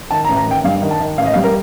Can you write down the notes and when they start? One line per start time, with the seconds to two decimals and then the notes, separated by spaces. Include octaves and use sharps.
0.11 D#3 A5
0.25 A#5
0.29 A1
0.37 A#5
0.46 D#3 G5
0.64 G2 F5
0.82 D#3
0.91 A5
1.00 D#3
1.18 A1 F5
1.25 D#5
1.33 G3 F5
1.44 A#4